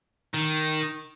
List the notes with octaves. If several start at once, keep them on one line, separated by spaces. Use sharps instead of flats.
D#3